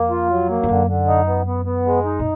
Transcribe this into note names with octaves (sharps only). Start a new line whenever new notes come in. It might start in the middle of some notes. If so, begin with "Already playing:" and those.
Already playing: F2 A#3
F4
F#3
A#3
F2
F#2 D3
D3
D#4
B3
B3
B3
G#3
D#4
A#2